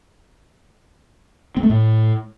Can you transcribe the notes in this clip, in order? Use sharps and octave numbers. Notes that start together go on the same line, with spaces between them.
C4
A3
A2